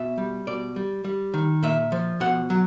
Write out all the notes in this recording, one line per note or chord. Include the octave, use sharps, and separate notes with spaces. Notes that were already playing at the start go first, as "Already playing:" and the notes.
Already playing: B2 E5
G3
B2 D5
G3
G3
D#3
A#2 E5
F3
B2 F#5
F#3